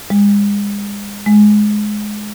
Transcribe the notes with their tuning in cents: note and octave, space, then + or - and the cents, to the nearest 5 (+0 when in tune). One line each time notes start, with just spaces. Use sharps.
G#3 -35
G#3 +15